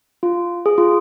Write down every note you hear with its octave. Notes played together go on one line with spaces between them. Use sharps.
F4
G#4
F4